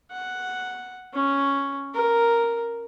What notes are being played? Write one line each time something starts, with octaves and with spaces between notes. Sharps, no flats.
F#5
C#4
A#4